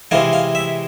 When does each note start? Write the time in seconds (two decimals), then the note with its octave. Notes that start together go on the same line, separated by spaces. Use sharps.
0.11 C3 E3 G#3 F5
0.33 F5
0.55 E5